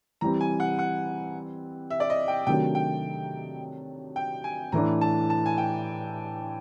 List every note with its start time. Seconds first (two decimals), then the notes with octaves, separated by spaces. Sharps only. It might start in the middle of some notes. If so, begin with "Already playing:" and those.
0.21 E3 G3 C4 A#5
0.41 G#5
0.60 F#5
0.79 F#5
1.90 E5
2.00 D5
2.10 D#5
2.28 G5
2.47 C3 D#3 F#3 A3 D4 G5
2.75 G5
4.16 G5
4.44 G#5
4.72 A2 E3 A3 D4 A#5
5.01 A5
5.30 A5
5.46 G#5
5.58 G5